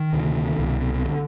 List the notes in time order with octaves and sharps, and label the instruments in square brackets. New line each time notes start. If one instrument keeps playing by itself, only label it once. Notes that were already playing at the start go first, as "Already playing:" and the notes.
Already playing: [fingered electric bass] D#3
D2 C3
C2 B2
D#3
D3